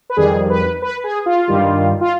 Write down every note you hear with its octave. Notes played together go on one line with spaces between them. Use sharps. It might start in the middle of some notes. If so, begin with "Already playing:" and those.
B4
F2 D#3 G3 G#4
B4
B4
G#4
F4
G2 D#3 G3
F4